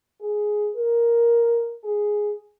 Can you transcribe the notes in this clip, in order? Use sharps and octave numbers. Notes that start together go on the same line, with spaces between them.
G#4
A#4
G#4